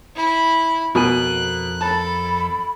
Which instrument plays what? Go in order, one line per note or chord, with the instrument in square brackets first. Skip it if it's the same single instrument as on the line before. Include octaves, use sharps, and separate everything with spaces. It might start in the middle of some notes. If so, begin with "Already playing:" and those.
[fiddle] E4 B5
[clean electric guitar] F2 A#4 G#5 [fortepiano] B2 [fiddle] F#6
[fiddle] A4 [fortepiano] A5 [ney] B5